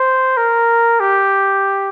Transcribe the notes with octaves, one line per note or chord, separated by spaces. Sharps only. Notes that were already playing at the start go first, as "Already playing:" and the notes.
Already playing: C5
A#4
G4